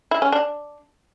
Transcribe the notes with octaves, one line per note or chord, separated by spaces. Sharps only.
E4
C#4
D4